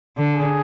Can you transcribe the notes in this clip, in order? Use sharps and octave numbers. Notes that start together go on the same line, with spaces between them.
D3
G#4